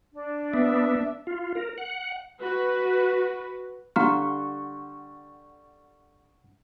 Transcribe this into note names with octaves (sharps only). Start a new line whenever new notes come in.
D4
B3 E5
F4
A#4
F#5
F#4 B4
D3 G3 F5 F#5 A#5 C6 C#6 F6